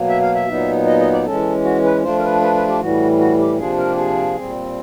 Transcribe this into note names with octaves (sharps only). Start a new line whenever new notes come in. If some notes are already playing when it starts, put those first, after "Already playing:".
Already playing: B2 F#3 A#3
E5
F5
E5
A#2 F#3 B3 D#4
D#5
D#5
D5
E3 G#3 C#4 A4
F#4
B4
F3 A3 D4 F4 C5
A#4
B4
B4
B4
G4
A2 E3 G3 F#4
F#4
G4
C3 F3 A#3 D4 F4 G#4
A#4
G4
G#4
A#2 G3 C4